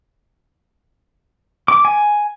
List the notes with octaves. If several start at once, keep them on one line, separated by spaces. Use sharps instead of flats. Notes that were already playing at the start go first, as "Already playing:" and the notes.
D6
G#5